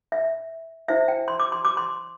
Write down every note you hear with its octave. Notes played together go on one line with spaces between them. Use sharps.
E5
E4 C5 E5
G5
C6
D6
C6
D6
C6